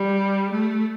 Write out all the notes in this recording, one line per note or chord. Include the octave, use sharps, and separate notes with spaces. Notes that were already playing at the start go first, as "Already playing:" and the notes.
Already playing: G3
A3